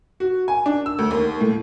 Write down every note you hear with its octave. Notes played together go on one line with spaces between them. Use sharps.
F#4
G#5
D4
E6
D2
D#2
A2